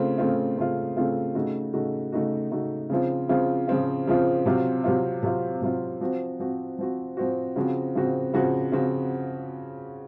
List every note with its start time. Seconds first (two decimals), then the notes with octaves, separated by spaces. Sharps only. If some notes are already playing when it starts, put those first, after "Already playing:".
Already playing: C#3 A3 C4 F4
0.18 C#3 A3 C4 F4
0.57 C#3 A3 C4 F4
0.97 C#3 A3 C4 F4
1.35 C#3 A3 D#4 F#4
1.74 C#3 A3 D#4 F#4
2.12 C#3 A3 D#4 F#4
2.51 C#3 A3 D#4 F#4
2.90 C#3 F3 C4 F4
3.29 C#3 F3 C4 F4
3.68 C#3 F3 C4 F4
4.07 C#3 F3 C4 F4
4.46 C3 F#3 C4 F4
4.84 C3 F#3 C4 F4
5.23 C3 F#3 C4 F4
5.62 C3 F#3 C4 F4
6.01 F3 C4 F#4
6.40 F3 C4 F#4
6.78 F3 C4 F#4
7.17 F3 C4 F#4
7.56 C#3 F3 C4 F#4
7.95 C#3 F3 C4 F#4
8.34 C#3 F3 C4 F#4
8.72 C#3 F3 C4 F#4